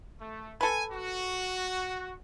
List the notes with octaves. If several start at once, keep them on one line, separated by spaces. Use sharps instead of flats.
A3
A4 B4 G#5
F#4